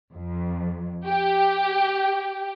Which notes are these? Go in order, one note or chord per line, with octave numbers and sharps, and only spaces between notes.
F2
G4